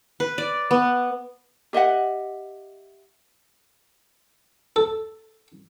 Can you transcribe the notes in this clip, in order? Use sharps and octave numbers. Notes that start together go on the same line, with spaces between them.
B4
D5
B3
G4 D#5 E5 F#5
A4